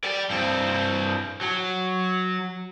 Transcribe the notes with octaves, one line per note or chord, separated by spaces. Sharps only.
D5 G5
G2 C4
F#3